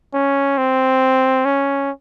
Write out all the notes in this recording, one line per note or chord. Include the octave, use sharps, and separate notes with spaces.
C#4
C4
C#4